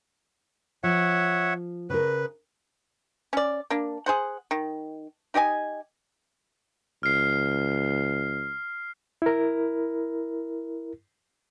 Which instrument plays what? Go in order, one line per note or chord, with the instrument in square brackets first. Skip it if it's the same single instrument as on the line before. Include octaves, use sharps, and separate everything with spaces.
[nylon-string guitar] F3 [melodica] C#5 E5 F#5
[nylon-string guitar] C#3 A#4 [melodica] B4
[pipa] C#4 D5
A#3 D4
G#4 C5 F#5
D#3
D#4 G4 D#5 G#5
[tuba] C#2 [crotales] F6 C7
[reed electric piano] E4 A#4